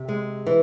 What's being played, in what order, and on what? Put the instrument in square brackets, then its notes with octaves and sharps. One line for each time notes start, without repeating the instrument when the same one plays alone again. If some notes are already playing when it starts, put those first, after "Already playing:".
Already playing: [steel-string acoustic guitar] C3
G#3
E3